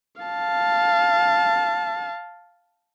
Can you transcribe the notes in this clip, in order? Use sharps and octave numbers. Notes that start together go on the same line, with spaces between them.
F5 A5